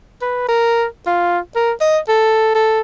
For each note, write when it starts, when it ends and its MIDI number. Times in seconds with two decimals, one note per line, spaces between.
0.22 0.47 71
0.48 0.84 70
1.07 1.39 65
1.56 1.72 70
1.81 1.98 75
2.08 2.51 69
2.55 2.81 69